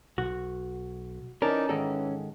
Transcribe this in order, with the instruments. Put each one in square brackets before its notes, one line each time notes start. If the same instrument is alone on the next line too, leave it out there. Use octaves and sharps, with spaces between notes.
[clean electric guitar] B1 [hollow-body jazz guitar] F#4
[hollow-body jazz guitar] E3 A#4 [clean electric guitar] C#4 [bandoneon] D#4 D5 A5
[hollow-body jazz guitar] G#2 D#3 A4 [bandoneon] E3